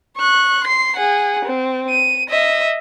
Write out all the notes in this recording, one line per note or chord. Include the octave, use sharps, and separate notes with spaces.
C#6 F#6
C6 C7
G#4 F#5
C4
D#7
D#5 E5